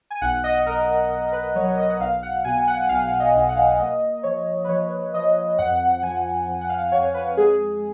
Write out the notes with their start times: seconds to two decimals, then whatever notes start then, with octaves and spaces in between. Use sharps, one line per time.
0.11 G#5
0.21 B1 F#5
0.44 D#5
0.66 B1 A#4
1.10 B1
1.32 B4
1.55 F#3 C#5
1.78 D#5
1.90 F#5
2.00 B1 F5
2.23 F#5
2.44 B2 G#5
2.67 F#5
2.89 B1 F5
3.20 D#5
3.35 B1
3.49 F#5
3.57 F5
3.66 F#5
3.79 A#3 D#5
4.23 F3 C#5
4.64 B4
4.68 F3 C#5
5.14 F3 D#5
5.58 F2 F#5
5.91 F#5
6.03 F3 G#5
6.47 F3
6.61 F#5
6.69 F5
6.92 F2 C#5
7.14 B4
7.37 G#3 G#4